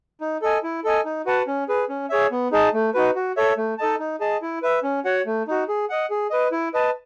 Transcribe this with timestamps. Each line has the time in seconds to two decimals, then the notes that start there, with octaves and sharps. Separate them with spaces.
0.21 D#4
0.42 A4 D#5 G#5
0.63 E4
0.84 A4 D#5 G#5
1.05 D#4
1.26 F#4 B4 F#5 A5
1.47 C#4
1.69 G#4 B4
1.89 C#4
2.10 G#4 C#5 E5
2.31 B3
2.52 D#4 G#4 D#5 A5
2.73 A3
2.94 D#4 F#4 B4
3.16 F#4
3.37 A4 C#5 E5
3.57 A3
3.78 D#4 A4 D#5 A5
3.99 D#4
4.20 G#4 D#5 A5
4.42 E4
4.62 B4 E5
4.83 C#4
5.05 F#4 C#5 F#5
5.26 A3
5.47 D#4 F#4
5.68 G#4
5.90 D#5 F#5
6.10 G#4
6.30 B4 D#5
6.52 E4
6.74 B4 D#5 A5